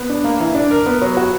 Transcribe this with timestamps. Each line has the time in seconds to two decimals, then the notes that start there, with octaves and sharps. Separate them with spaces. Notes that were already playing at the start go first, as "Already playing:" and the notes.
Already playing: B3
0.10 D4
0.24 A#3
0.40 E3
0.55 D4
0.71 A#4
0.86 B3
1.02 F#3
1.17 F#4